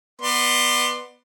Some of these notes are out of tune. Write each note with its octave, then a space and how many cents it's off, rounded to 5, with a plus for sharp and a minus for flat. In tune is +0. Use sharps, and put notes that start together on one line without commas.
B3 +0 D5 +30 C6 +0